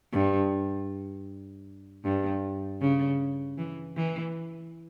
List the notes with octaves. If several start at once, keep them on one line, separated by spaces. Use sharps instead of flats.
G2
G2
C#3
E3
E3